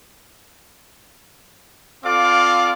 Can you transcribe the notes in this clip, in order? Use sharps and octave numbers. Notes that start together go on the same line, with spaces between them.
C4 F4 A4 D5 F5 D6